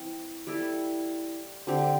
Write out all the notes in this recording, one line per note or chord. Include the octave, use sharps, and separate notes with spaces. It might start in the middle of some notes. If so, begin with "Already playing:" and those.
Already playing: E3 C4
G3 E4 A4
D3 C4 G4